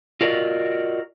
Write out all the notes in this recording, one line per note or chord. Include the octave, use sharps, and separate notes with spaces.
F4 F#4 A#4 D5 D#5